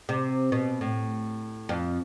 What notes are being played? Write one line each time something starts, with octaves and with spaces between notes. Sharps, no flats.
C3
B2
A2
F2